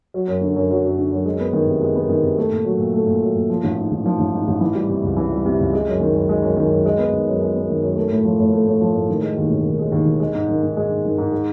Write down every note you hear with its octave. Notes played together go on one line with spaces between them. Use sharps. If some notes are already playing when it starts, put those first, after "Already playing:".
F#3
F#2
D3
F#2
F#3
F#2
D3
F#2
G#3
B3
D#3
C3
G#3
B3
D#3
C3
A3
A#2
F#3
A#2
A3
A#2
F#3
A#2
F3
A1
G#2
A1
F3
A1
G#2
A1
E3
G3
C3
C#2
E3
G3
C3
C#2
G#3
F#2
D#3
F#2
G#3
F#2
D#3
F#2
G#3
B3
D#3
F#2
G#3
B3
D#3
F#2
A3
A2
F3
A2
A3
A2
F3
A2
D#3
G#3
D#2
E1
D#3
G#3
D#2
E1
G#3
G#2
D#3
G#2
G#3
G#2
D#3
G#2
G#3